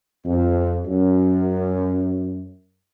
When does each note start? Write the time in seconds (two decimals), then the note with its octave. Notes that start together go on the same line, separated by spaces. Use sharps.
0.25 F2
0.85 F#2